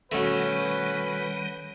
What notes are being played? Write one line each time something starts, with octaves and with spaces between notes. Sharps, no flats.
B2 D#3 G3 A3 C#4 B4 F#5